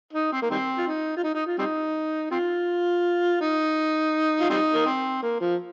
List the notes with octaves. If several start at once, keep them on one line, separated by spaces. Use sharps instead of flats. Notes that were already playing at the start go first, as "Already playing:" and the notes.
D#4
C4
A#3
D#3 G3 C4
F4
D#4
F4
D#4
D#4
F4
G3 C4 D#4
C4 F4
D#4
F4
G3 C4 D#4
A#3
C4
A#3
F3